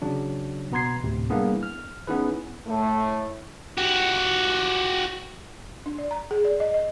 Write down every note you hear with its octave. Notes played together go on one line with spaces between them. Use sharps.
C#3 F#3 D4
B2 B3 A#5 C6 G#6 C7
D2 A2 C3
G3 A#3 B3 D4 E4 G#4
F6
B3 C#4 D#4 E4 G#4 B4
A2 A3
F#4 G4
D4
D5
A#5
G#4
D5
D#5
D#5